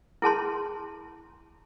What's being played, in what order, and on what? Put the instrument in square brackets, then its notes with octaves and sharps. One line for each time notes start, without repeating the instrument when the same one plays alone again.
[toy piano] E4 G#4 A5 C6